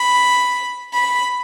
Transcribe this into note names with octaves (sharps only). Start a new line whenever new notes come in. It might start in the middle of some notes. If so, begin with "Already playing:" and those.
Already playing: B5
B5